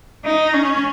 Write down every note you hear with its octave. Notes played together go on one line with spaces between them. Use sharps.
D#4
C#4